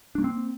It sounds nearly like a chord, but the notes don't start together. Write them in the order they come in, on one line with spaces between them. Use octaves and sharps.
D4 A3 A#3 C4